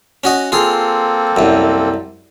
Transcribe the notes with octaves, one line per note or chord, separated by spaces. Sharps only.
C#4 F#4 D#5
A#3 C4 F4 G#4 A4
C2 F#2